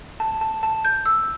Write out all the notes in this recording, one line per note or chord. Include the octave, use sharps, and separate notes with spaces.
A5
A5
A5
G6
E6